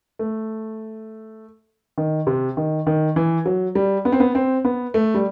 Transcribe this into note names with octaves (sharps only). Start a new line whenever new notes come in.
A3
D#3
C3
D#3
D#3
E3
F#3
G3
B3
C4
B3
C4
B3
A3
G3